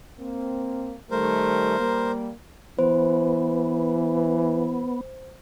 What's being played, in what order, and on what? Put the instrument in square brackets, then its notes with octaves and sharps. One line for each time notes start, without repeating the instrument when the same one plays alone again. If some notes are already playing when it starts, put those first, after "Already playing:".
[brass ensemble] A#3 C4
[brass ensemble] D#3 G3 A3 [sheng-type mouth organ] A#4 C5
[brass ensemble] G3 A#3
[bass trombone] E3 [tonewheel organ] B3 [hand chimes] C5